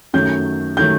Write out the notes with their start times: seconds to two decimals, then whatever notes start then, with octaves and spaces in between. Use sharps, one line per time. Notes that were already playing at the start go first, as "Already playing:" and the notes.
0.13 F#2 D#3 F#3 A3 G6
0.77 D#3 F#3 A3 G6